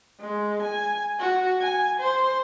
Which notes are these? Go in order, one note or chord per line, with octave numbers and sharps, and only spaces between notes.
G#3
G#5
F#4
G#5
C5